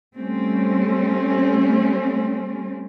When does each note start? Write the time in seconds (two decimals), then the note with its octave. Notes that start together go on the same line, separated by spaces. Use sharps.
0.18 G3 A3 C4 C#4